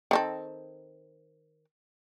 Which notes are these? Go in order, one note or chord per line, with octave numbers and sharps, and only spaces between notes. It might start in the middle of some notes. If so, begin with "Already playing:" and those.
D#3 C4 A4